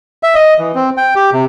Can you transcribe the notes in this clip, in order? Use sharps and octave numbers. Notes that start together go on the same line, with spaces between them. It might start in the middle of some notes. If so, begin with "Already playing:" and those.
E5
D#5
E3
C4
G5
G4
C3